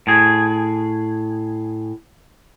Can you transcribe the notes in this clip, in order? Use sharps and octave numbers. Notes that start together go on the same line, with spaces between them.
A2 G#4